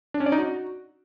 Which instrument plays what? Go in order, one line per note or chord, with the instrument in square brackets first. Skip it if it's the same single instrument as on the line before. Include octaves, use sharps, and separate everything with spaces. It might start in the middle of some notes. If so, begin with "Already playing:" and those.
[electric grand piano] D4
C#4
D5
D#4
F#4